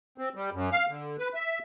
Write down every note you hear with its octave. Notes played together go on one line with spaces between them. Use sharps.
C4
G3
F#2
F5
D3
B4
E5